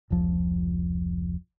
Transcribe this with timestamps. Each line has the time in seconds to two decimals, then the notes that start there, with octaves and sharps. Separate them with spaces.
0.10 F1 C#2 F3